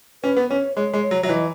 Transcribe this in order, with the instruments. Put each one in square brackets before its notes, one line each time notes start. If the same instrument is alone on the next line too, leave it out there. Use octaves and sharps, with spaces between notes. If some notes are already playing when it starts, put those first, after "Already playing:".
[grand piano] C#4 [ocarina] B4
[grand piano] B3
[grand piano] C#4 [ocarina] C#5
[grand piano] G#3 [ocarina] C#5
[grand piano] G#3
[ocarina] C#5
[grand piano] F#3
[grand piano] F#3 [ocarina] E5
[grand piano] E3 [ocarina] D#5